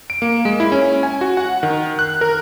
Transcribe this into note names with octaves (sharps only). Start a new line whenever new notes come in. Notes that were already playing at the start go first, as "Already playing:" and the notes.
D7
A#3
G#3
E4
C#4
G#5
F#4
F#5
D#3
F#6
A#4